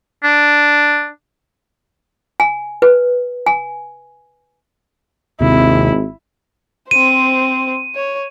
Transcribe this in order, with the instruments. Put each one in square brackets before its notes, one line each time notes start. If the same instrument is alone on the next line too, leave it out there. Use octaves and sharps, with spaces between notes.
[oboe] D4
[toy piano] G#5
B4
G#5
[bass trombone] G#1 [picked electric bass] D#2 C3 [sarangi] E4
[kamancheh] C4 C5 [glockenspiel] D#7
[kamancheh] C#5